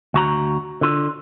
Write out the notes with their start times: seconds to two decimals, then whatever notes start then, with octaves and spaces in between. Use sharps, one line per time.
0.14 D2 F#4 A#5
0.81 D3 F4